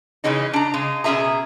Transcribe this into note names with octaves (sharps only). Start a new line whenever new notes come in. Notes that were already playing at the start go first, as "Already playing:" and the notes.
C#3 E3 G#3 C#4 D#4
D4 A#5
C#3 G#3
B2 C#4 G4 G#4 E5 A#5